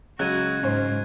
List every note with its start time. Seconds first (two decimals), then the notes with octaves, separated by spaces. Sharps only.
0.19 C#3 F#3 G#3 F#4 F#6 G#6 D#7
0.63 G#2 F#3 C#4 C5